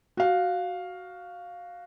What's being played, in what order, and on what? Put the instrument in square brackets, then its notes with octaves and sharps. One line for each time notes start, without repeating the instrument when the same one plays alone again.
[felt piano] F#4 F5